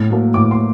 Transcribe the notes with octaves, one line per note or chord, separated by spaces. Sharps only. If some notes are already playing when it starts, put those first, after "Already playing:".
Already playing: A2
F#3 A#3
A2 D6
C6